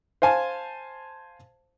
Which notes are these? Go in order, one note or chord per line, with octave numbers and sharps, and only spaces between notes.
C5 F5 G#5 A5